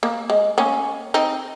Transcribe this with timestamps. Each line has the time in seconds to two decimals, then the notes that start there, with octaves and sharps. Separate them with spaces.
0.03 A#3
0.30 G#3
0.58 A#3 C#4
1.14 C4 D#4